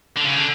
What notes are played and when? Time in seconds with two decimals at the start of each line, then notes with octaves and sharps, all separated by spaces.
0.16 D3
0.24 C#3
0.34 D3